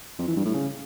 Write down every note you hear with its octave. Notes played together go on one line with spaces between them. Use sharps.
F2
E3
G2
A2
C#3